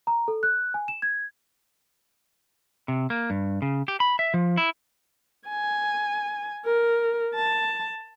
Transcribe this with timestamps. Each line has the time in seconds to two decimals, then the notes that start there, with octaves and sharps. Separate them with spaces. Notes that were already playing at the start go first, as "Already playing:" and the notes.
0.07 A#5
0.28 A4
0.43 F#6
0.74 G#5
0.88 E7
1.02 G#6
2.88 C3
3.10 A#3
3.30 G2
3.62 C#3
3.88 G4
4.00 B5
4.19 E5
4.34 F3
4.57 E4
5.48 G#5
6.65 A#4
7.35 A5